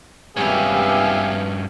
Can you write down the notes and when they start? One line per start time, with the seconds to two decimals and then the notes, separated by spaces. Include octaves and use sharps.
0.37 G#1 G2 B3 C#4 G4 E5 F5 G#5